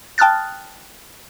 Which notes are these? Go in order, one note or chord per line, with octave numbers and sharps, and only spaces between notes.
G5 A5 D#6 F6 F#6 A6